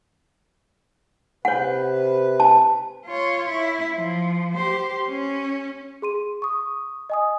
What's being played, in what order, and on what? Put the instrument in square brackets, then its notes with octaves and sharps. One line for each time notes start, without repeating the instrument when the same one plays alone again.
[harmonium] C3 B4 [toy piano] C#5 F#5
[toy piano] A5
[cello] F4 C#5
E4
F3
G4 C5
C#4
[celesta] G#4 C6 D#7
C#6 D#6
D#5 G#5 D#6